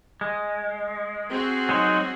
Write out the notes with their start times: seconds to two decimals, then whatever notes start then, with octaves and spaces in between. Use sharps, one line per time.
0.21 G#3
1.30 C4 F#4 G#4
1.69 F#3 G#3 D#4